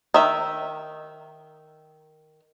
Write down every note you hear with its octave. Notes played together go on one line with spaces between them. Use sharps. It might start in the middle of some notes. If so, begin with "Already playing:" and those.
D#3 E5